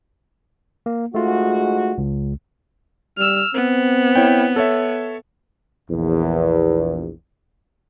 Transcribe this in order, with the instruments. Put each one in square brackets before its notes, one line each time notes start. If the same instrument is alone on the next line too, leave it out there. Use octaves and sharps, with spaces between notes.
[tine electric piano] A#3
[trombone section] G#2 G#3 F#4 [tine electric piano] A3 F4
[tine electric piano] C#2
[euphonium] G3 [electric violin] E6 F6
[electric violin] B3 [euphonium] C4
[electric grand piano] E4 C#5 G5
A4 C#5 E5
[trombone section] A#1 E2